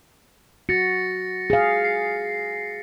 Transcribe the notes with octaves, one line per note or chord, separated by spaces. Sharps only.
F#4 A6 A#6 C#7
G#4 F5
C7